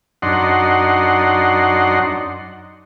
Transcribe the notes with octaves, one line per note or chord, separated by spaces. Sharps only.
F#2 D4 D#4 F#5 C6